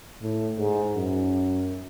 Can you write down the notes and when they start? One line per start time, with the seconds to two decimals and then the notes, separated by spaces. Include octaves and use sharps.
0.22 A2
0.58 G#2
0.95 F#2